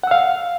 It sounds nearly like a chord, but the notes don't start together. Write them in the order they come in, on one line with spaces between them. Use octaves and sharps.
F#5 E6 F5